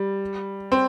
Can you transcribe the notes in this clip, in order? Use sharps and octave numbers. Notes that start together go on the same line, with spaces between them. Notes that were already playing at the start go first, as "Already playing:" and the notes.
Already playing: G3
C4